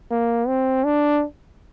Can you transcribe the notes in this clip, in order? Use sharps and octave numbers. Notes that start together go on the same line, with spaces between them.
A#3
C4
D4